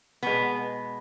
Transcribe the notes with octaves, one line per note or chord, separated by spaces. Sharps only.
B2 G#3 B3